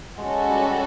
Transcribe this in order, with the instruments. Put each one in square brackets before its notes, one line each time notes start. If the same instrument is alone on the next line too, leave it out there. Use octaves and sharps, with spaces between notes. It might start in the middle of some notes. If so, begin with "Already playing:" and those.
[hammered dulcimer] G#3 [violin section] C#4 F#4 A4
[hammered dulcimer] G3